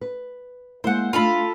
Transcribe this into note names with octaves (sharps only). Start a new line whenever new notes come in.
B4
G#3 A#3 E4 C5 F#5
A3 D4 F4 A4 B5